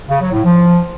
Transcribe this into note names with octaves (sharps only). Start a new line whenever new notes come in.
C#3
F#3
A2
F3